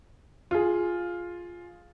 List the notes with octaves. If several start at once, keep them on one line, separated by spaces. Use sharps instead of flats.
F4 G#4